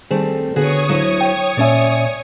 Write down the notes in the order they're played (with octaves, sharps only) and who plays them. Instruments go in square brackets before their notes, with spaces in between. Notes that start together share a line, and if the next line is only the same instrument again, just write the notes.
[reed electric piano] D#3 G#4 [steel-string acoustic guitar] G3 A3 C4
[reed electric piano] D3 [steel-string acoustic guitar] B3 F#4 G#4 [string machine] C#5 C#6 D#6
[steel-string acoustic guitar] D2 F#3 E4
[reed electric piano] G5
[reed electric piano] A#2 C#4 E5 [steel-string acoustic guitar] D5 G#5